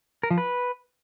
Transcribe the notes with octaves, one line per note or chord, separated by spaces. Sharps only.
A#4
F3
B4